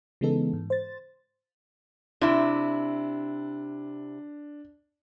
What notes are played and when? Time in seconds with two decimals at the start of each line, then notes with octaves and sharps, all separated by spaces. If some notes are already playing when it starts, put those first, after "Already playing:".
0.21 C#3 E3 G#3 B3 D#4 A4
0.53 G#2
0.70 C5 A6
2.21 C3 D4 E4